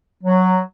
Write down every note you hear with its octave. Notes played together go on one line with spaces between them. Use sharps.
F#3